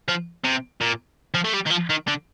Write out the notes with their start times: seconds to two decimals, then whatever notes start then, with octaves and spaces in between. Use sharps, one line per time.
0.09 F3
0.45 C3
0.81 A#2
1.34 F3
1.45 A3
1.54 G3
1.66 D#3
1.71 F3
1.90 D#3
2.07 D3